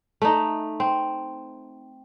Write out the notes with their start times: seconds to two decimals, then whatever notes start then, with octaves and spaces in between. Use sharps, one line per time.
0.22 A3 D#4
0.80 C4